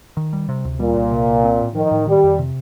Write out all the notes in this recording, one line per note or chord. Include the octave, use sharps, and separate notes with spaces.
D#3
G3
C3
D2
A#2 G3
C2
C3
C2
C4
A2
D#3 F3
A2
D#3 G3
F2
C3